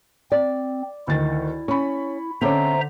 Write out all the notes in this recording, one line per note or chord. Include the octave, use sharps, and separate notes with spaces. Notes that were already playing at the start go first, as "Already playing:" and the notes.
C4 D5
D2 D#3 E4 A6
C#4 B5 C#6
D3 C4 C#4 C5 C#5 E5 A#5 D6